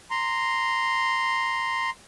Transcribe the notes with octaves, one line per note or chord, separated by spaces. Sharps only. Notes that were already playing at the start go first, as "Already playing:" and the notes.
A#5 C6